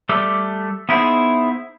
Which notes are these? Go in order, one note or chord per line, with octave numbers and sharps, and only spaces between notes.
G3 A3 G4 A4
B3 D#4 E4 G#4 C5